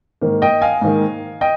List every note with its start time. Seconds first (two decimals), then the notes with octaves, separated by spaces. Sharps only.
0.22 G#2 D#3 A#3
0.42 D#5 G5
0.62 F5 G#5
0.81 G#2 D#3 A#3
1.41 D#5 G5